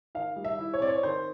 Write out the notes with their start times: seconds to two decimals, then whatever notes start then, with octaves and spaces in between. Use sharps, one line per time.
0.15 D#3 F5
0.36 G3
0.45 E5
0.59 E4
0.74 C#5
0.81 C4 D5
0.89 C#5
1.03 D#3 C5